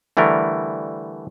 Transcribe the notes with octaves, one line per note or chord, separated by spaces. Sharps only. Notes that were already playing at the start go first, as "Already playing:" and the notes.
D3 E3 G3 A3 A#4